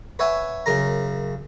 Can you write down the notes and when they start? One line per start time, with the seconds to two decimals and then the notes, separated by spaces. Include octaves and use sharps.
0.19 B4 C#5 E5 F#5 G#5
0.66 F#2 C#3 A#4 A#5